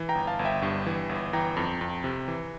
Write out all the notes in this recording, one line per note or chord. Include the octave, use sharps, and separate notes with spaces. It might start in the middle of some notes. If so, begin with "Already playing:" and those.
Already playing: E3
G5 A#5
G1
F5 A5
G1
E5 G5
G2
E3
G1
E3 G5 A#5
F2
F2
C3
E3